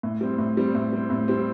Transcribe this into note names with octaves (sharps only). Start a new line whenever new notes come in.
A2
G3 C4
A2
G3 C4
A2
G3 C4
A2
G3 C4